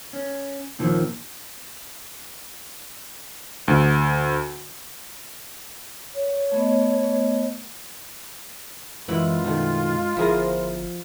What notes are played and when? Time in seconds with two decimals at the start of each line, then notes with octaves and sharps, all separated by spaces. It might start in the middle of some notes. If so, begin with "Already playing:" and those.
0.13 C#4
0.79 D#2 A#2 D#3 F3 C4
3.68 D2
6.14 C#5
6.52 A3 B3 D#5
9.08 F#2 E3 G#3 E4 F4 B4
9.44 B2 D#3 A3
10.17 G1 F3 E4 G#4 A#4